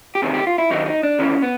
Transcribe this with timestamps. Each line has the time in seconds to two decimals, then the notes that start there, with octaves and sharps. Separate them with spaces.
0.15 G4
0.22 E2 C3 D#3 G#4
0.34 G4
0.47 F4
0.58 E4
0.70 D#2 D#3 F#3 D#4
0.86 D#4
1.03 D4
1.19 D#2 C#3 E3 C#4
1.42 B3